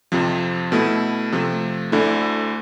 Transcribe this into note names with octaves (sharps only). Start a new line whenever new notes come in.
F2 C3 F3
B2 A3 E4
C3 F3 A3
D2 D3 A3 E4